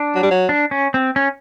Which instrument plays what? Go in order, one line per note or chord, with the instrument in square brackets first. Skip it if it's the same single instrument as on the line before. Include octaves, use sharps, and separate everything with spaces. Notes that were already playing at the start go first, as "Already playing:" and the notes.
Already playing: [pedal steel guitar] D4
[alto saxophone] F#3
G3
F#3
[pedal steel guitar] D4
C#4
C4
C#4